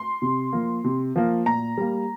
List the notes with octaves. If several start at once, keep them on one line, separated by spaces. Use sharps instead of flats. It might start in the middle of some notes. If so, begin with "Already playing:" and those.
Already playing: C6
C3
F3 A#3
C3
F3 A#3
A#2 A#5
G3 A#3